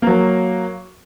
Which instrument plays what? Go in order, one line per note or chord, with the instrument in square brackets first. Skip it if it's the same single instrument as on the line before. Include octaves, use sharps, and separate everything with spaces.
[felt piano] F#3 A#3